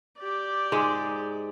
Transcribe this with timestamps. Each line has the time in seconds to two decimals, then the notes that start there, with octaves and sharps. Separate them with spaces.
0.19 G4 D5
0.72 G#2 G#3